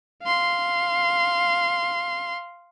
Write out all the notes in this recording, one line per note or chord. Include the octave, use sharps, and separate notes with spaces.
F5 C6